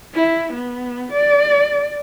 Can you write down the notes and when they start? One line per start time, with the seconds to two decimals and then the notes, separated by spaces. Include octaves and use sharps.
0.14 E4
0.53 B3
1.12 D5